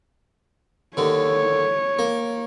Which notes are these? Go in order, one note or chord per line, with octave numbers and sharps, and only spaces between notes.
D#2 D3 C#5
A#3